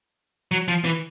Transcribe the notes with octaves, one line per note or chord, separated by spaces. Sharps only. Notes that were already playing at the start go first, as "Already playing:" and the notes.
F#3
F3
E3